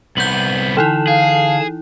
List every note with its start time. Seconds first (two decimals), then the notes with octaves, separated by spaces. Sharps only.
0.17 C2 B3 G6 F#7
0.77 D3 E3 D#4 E4 A5
1.07 G#4 F5